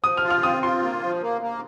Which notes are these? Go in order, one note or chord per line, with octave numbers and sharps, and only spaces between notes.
F3 D#6
F6
F4
F6
C4 D#6
F4 C6
A#3
F3
A#3
A#3